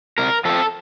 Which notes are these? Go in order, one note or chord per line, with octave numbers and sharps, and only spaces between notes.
C3 A#4
F3 A3 C4 A4